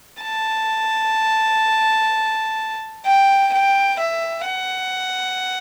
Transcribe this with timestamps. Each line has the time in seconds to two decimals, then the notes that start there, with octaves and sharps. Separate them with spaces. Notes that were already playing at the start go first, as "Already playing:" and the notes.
0.22 A5
3.06 G5
3.53 G5
4.00 E5
4.47 F#5